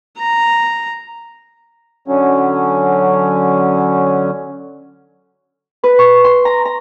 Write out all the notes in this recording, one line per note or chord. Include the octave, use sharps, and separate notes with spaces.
A#5
D3 F#3 C#4
B4
C#6
C6
A#5
A#5